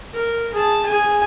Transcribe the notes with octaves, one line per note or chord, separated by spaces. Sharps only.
A#4
G#4 A5
G#4 G#5